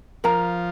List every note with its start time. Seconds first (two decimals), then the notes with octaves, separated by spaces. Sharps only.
0.24 F3 A#4 F5 A#5